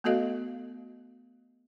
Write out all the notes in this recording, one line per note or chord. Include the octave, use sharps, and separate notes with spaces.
A3 B3 F#4 A4 D#5 F5